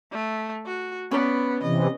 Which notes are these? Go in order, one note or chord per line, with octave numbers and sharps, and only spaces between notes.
A3
F#4
B3 C#4 B4 D5
C3 E3 D#5